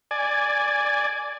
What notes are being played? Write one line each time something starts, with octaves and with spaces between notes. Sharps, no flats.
D5 G#5